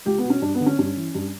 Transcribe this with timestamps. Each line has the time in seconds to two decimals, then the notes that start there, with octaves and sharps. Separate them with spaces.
0.06 C#2 G4
0.18 B3
0.24 B2
0.30 C#4
0.42 G2 D4
0.55 B3
0.60 D3
0.66 C#4
0.78 G2 C#4
0.97 E3
1.15 G2